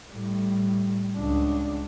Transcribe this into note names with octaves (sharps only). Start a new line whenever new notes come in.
A2 G3
C#2 D4